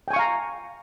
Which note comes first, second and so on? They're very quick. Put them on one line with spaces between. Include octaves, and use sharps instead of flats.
G5 G#5 C#6 F5 A#5